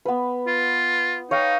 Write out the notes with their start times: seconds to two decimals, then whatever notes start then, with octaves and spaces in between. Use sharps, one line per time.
0.05 B3 B4
0.47 F4
1.31 D#4 C#5 F5 G5